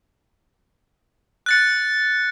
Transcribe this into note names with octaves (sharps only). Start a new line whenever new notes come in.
F#6 A6 C#7